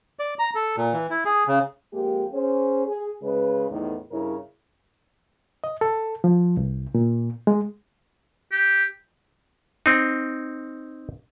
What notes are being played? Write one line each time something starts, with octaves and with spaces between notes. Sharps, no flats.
D5
A#5
A4
A#2
E3
E4
G#4
C#3
F2 G#3 A#3 G4
C#4 G#4 C5
G#4
C#3 G#3 B4
E2 A2 D#3
G2 C#3 E4 A#4 C#5
D#5
A4
F3
C2
A#2
G#3
G4
C4 D#4